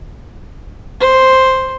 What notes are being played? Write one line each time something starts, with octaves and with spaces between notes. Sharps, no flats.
C5